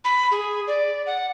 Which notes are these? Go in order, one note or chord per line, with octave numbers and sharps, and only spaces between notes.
B5
G#4
D5
F#5